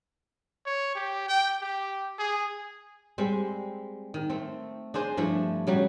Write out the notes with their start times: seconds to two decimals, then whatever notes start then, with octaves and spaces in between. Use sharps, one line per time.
0.66 C#5
0.95 G4
1.28 G5
1.61 G4
2.19 G#4
3.18 G3 G#3 C4
4.14 D#3
4.30 A3 C4
4.94 D4 G#4 C5 D#5
5.17 G2 F3 A3 E4
5.67 C#3 F#3 G3